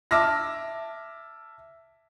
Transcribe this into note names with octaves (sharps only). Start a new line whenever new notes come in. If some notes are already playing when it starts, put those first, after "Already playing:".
E5 A5 D6 E6 F6 A#6